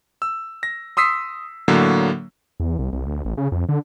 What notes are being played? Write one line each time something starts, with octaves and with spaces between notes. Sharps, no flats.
E6
A#6
C6 D#6 E6 B6 C7
A2 D3 F#3 A#3
E2
C2
C2
D2
A1
C#3
F2
D3